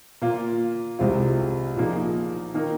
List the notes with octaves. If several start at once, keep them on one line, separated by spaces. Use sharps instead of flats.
A#2 A#3 F4
C2 C3 G#3 C4 F4
A#2 F3 A#3 D#4 G#4
D#3 A#3 D#4 A#4